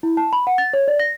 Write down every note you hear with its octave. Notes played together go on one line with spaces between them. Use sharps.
E4
A5
B5
F#5
A6
C#5
D5
A#6